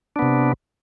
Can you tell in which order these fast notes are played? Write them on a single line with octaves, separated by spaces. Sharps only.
D4 B3 C3